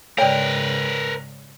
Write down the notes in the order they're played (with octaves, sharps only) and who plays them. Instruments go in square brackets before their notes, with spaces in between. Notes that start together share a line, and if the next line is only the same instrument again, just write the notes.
[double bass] G#2 C#3 [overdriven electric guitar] A#4 B4 [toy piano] C#5 D5 [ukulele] G5